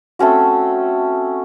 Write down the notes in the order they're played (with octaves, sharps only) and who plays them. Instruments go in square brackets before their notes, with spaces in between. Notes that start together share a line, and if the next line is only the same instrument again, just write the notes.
[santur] A3 C4 C#4 F#4